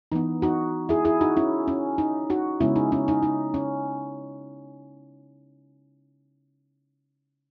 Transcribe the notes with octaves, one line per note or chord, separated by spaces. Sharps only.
E3 B3 D#4
D#4 F#4
E4 G#4
E4 G#4
D#4 F#4
C#4 E4
C#4
D#4
D#4 F#4
C#3 G#3 B3 C#4 E4
D#4
C#4
D#4
D#4
C#4